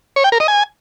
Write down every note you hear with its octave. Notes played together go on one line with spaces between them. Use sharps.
C#5
G5
A#4
D#5
G#5